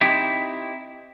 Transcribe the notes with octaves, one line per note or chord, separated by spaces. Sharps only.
C4 D#4 E4 G4 E5